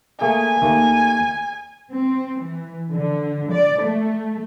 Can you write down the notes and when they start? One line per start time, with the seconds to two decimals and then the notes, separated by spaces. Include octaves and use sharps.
0.21 A3 A#3 G#4 G#5
0.62 D#2 A3 A#3
1.91 C4
2.41 E3
2.91 D3
3.51 D5
3.83 A3